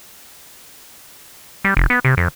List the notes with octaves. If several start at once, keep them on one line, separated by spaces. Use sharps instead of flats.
G3
F1
B3
C3
F2